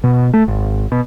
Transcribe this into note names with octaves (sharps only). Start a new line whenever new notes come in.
B2
A3
G#1
B2